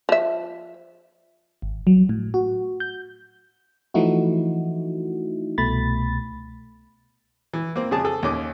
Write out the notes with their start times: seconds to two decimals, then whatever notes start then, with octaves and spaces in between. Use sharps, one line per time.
0.09 F3 E5
1.62 G#1
1.87 F#3
2.09 A2
2.34 F#4
2.80 G6
3.94 E3 F3 A3 D#4 E4 F#4
5.58 C2 B2 A3 B5 A6
7.53 E3
7.76 A#3 C4
7.91 F2 C#3 G#4 A5
8.04 G#4 A4
8.23 D#2 D#3 C#4 D6